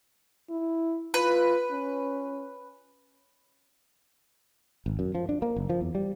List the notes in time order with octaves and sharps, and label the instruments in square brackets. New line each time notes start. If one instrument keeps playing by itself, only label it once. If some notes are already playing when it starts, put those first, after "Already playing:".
[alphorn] E4
[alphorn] F4 [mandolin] B4
[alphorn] C#4
[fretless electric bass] G#1
F#2
F3
D4
A#3
F#1
F3
E2
G3